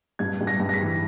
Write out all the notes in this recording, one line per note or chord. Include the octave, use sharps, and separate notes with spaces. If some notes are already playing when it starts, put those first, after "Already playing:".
G2 G#6
G2
A#6
G2
A#6
B6
E3